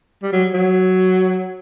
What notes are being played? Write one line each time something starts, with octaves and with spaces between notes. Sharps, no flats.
G3
F#3
F#3